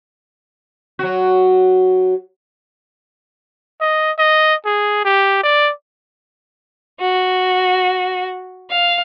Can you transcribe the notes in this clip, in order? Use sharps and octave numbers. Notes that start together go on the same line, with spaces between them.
F#3 F#4
D#5
D#5
G#4
G4
D5
F#4
F5